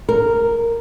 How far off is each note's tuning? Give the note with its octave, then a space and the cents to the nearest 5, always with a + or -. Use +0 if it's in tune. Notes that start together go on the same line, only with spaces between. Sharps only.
A#4 -5